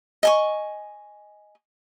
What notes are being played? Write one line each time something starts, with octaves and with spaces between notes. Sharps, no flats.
D#5 G#5 C#6